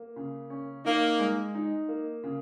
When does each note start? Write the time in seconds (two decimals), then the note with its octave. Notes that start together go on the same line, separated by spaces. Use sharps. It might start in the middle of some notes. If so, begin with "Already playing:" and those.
Already playing: A#3
0.16 C#3
0.50 C#4
0.85 A#3 D#4
1.19 G#3
1.55 D#4
1.89 A#3
2.23 C#3